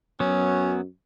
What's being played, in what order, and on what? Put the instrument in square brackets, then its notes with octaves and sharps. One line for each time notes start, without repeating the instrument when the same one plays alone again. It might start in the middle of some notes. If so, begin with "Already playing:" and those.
[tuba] F#2 [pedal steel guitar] F#3 B3 [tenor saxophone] C#4